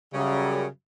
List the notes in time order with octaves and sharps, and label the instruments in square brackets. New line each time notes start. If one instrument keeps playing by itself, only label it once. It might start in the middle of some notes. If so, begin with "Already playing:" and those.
[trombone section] F#2 G3 [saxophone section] C#3